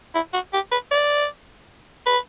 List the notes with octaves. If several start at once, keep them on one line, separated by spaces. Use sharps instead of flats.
E4
F#4
G4
B4
D5
B4